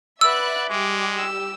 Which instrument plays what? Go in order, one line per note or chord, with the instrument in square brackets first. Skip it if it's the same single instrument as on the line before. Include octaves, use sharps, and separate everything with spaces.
[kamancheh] B4 B5 [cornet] D5 [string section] E5 F#5 F#6 [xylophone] E6
[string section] G3 G4 [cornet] G#3 [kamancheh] D6
[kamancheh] E6